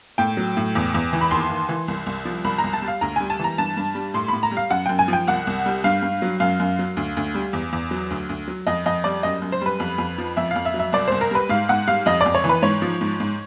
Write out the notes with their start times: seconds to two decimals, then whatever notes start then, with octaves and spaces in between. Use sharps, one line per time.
0.18 A2 G5
0.37 F#3
0.57 A2
0.75 E2
0.94 E2
1.13 E3
1.21 B5
1.31 D#2 C6
1.50 D#2
1.69 E3
1.88 C2
2.06 C2
2.25 F3
2.44 C2 B5
2.58 A#5
2.64 C2
2.73 A5
2.82 G3
2.88 F5
3.01 D2 A#5
3.16 G3 G#5
3.30 A5
3.39 E3 A#5
3.58 G2 A5
3.77 G2
3.95 G3
4.14 A2 C6
4.28 A2 B5
4.43 A#5
4.51 G3
4.57 F5
4.70 F#2 F#5
4.86 F#2 G5
4.99 G#5
5.08 F3 G5
5.27 C2 F#5
5.47 C2
5.66 G3
5.84 G2 F5
6.03 G2
6.22 F#3
6.40 F#2 F5
6.60 F#2
6.79 F#3
6.97 D2
7.17 D2
7.35 G3
7.53 E2
7.73 E2
7.91 F#3
8.10 D2
8.29 D2
8.48 F#3
8.67 F2 D#5
8.86 F2 D#5
9.04 G3 D5
9.23 F#2 D#5
9.42 F#2
9.52 C5
9.61 G3 B4
9.80 F2
9.98 F2
10.18 F3
10.37 F2 E5
10.51 F2 F5
10.65 E5
10.74 F#3
10.79 E5
10.93 C2 D5
11.08 C2 C5
11.21 A#4
11.31 G3 B4
11.49 G#2 F5
11.69 G#2 F#5
11.87 G3 F5
12.06 F2 D#5
12.21 D5
12.26 F2
12.35 C#5
12.44 E3
12.49 B4
12.62 G#2 C#5
12.82 F3
13.01 G#2
13.20 G#2